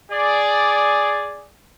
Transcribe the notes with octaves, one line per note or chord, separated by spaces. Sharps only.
G#4 D5